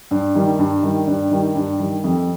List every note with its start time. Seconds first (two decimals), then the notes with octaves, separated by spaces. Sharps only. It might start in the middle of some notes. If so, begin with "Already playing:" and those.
0.11 G2
0.35 D#3 G3
0.59 G2
0.83 D#3 G3
1.07 G2
1.31 D#3 G3
1.55 G2
1.79 D#3 G3
2.04 F2